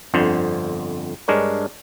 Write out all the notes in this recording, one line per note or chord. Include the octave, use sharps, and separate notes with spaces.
G1 F2 D3 C5
G2 G#3 D4 A#4 C#5